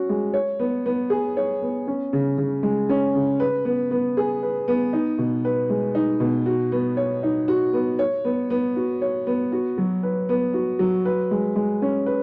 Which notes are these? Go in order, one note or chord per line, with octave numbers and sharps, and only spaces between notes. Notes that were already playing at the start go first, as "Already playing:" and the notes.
Already playing: C#4 F#4
G#3
C#5
B3
B3
G#4
C#5
B3
C#4
C#3
C#3
G#3
C#4
C#3
B4
B3
B3
G#4
B4
B3
D#4
B2
B4
G#3
D#4
B2
F#4
B3
C#5
D#4
F#4
B3
C#5
B3
B3
F#4
C#5
B3
F#4
F#3
B4
B3
F#4
F#3
B4
G#3
G#3
C#4
B4